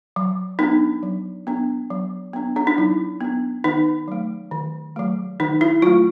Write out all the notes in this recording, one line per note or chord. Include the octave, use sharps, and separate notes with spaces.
F#3
B3 D4 D#4
F#3
B3 D4
F#3
B3 D4
D4
D#4
F#3 E4
B3 D4
D#3 D#4
F#3 A3
D#3
F#3 A3
D#3 D#4
E4
F#3 A3 F4